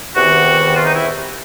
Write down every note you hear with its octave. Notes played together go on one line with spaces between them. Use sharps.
E2 C3 D#3 F#4
F4
D#4
E4